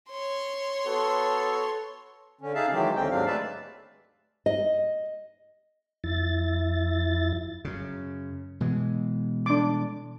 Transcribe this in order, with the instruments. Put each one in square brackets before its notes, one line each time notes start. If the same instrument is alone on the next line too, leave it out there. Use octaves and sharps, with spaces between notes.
[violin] C#5 C6
[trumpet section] B3 F#4 A4
[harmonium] D3 C#4
C#3 D#4 G#4 E5 F5 A5
D#3 E3 F#3 G#3 G4
D#2 D3 C4 C#4 G5
D#2 G#2 F#3 C4 D4 F5
G#3 A3 B4 D5 E5 A5
[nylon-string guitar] D#5
[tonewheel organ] F2 E4 A6
[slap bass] F#2 C#3
B2 E3 G#3
[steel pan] D4 D6